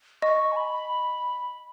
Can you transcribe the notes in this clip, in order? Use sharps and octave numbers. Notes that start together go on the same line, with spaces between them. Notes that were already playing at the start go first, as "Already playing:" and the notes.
D#5 C#6
G#5
B5